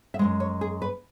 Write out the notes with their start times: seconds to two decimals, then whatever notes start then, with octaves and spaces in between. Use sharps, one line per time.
0.14 E5
0.19 F#2 D#3 G#3 D#5
0.40 C#5
0.61 G#4
0.82 B4